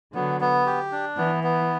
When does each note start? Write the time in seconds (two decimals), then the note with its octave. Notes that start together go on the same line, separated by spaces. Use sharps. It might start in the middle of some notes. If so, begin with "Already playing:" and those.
0.14 D3 F#3 B3
0.41 B3
0.66 G4
0.92 D4
1.18 E3 B3
1.44 B3